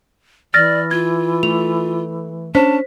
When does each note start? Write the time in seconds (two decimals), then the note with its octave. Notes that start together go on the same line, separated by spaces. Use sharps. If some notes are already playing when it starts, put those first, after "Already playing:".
0.54 E3 D5 F6 A6 A#6
0.91 F4 G#6
1.43 A3 F7
2.55 C#4 D4 C5 A5 B6